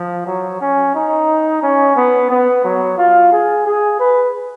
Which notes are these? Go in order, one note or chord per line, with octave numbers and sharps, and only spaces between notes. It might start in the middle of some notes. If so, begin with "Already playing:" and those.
Already playing: F3
F#3
C#4
D#4
C#4
B3
B3
F#3
F4
G#4
G#4
B4